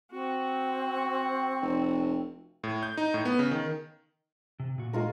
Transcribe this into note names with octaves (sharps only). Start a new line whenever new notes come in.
C4 F#4
F1
A2
G6
D#4
A2
B3
C#3
D#3
C3
A#2 F#4
G#3 F4 A#4